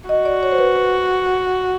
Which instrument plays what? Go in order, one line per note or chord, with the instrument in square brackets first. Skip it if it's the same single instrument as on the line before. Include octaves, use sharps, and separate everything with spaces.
[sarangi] F#4 [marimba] D#5
[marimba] D5
C#5
C5
B4
B4